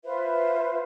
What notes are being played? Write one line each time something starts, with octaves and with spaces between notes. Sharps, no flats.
F4 B4 C5 E5